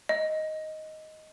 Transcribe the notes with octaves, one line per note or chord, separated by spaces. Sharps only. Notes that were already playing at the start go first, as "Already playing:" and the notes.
D#5